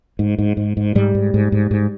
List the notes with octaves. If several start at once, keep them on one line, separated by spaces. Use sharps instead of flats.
G#2
G#2
G#2
G#2
G#2 G3
G#2
G#2
G#2
G#2